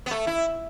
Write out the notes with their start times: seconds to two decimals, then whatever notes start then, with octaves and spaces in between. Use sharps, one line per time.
0.06 B3
0.11 A3
0.27 E4